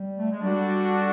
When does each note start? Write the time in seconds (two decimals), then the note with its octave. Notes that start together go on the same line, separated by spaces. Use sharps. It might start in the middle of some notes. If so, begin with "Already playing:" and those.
Already playing: G3
0.18 A3
0.31 G#3
0.42 G3 D4 F#4 A4